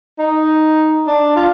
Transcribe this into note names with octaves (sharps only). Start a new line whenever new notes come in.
D#4
D4
F4